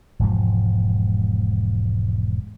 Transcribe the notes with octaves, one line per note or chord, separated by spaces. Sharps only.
E1 G#2 F3